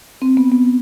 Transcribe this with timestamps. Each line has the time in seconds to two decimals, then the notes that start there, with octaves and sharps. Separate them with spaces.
0.22 C4
0.37 B3
0.52 B3